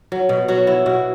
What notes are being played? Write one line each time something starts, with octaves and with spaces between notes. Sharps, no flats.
F#3
B2
F#3 F#4
F#3 E4
B2 F#4